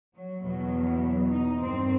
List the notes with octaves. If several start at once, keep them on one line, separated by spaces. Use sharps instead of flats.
F#3
E2 B2 F#3
F#3
D#4
G2 D#3 C4